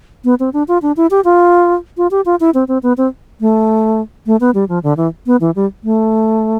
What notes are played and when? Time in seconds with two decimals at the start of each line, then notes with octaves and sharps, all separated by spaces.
0.25 B3
0.40 C4
0.53 D4
0.68 F4
0.82 D4
0.97 E4
1.11 G4
1.25 F4
1.97 F4
2.11 G4
2.25 F4
2.40 E4
2.54 C4
2.68 C4
2.83 B3
2.97 C4
3.41 A3
4.26 A3
4.40 B3
4.55 G3
4.69 F3
4.83 D3
4.97 E3
5.26 B3
5.41 E3
5.56 G3
5.84 A3